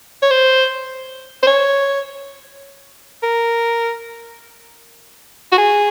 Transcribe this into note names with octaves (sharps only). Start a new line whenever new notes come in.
C#5
C5
C5
C#5
A#4
F#4
G#4